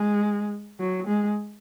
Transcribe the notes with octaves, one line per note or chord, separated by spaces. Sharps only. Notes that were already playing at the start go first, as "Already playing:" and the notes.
Already playing: G#3
F#3
G#3